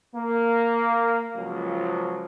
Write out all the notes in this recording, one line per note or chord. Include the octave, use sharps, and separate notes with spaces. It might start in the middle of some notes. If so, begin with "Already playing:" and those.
A#3
C#2 F3 F#3